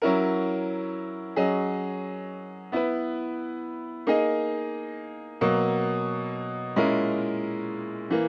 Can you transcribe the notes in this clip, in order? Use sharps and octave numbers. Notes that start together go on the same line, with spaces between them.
F#3 C#4 E4 A#4
F#3 C#4 G#4 D#5
B3 E4 B4
A#3 D#4 G#4 D#5
B2 F#3 A#3
A#2 G#3 C#4 E4 A#4
E3 A#3